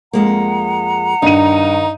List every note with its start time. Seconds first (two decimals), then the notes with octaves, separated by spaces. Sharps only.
0.13 F2 G#3 A#3 F#5 A#5
1.22 G2 D#3 D#4 D#7